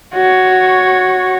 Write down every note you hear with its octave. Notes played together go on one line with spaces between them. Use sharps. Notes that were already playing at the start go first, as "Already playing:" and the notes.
F#4 C#5